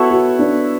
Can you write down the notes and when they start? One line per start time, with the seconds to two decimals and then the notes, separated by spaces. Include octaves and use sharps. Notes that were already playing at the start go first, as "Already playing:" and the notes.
Already playing: B3 E4 F#4 A4 C#5
0.10 F#4
0.39 D4